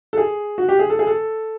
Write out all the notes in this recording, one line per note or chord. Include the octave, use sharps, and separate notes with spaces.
A4
G#4
F#4
G4
G#4
A4
G#4
A4